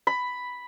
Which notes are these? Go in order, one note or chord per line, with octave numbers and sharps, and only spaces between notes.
B5